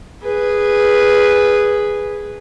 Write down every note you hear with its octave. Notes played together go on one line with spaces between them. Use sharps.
G#4 B4